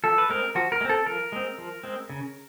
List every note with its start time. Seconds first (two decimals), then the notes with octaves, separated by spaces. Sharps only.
0.04 F3 A4
0.18 B4
0.30 G#3 C4 A#4
0.55 F3 F#4
0.72 A#4
0.81 G#3
0.85 C4 A4
1.06 F3 A#4
1.32 G#3 C4
1.58 F3
1.84 G#3 C4
2.10 C#3